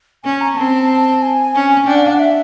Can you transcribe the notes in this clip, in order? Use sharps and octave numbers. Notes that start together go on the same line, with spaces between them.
C#4 G#5
A#5
C4 A5
G#5
C#4
D4 G5
F#5
F5
F#5
E5